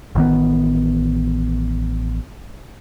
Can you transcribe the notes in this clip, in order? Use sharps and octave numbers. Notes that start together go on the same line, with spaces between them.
A1 D#3 B3